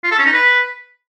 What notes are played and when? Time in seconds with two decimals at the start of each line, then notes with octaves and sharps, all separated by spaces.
0.04 F4
0.11 A4
0.19 C#4
0.26 D#4
0.33 B4